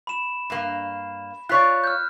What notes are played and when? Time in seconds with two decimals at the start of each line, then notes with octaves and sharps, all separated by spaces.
0.07 B5 E7
0.50 G2 A#3
1.49 F4 C#5 D5 F#6 B6
1.84 F6 G6